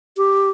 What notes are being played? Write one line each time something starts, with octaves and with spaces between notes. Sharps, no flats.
G4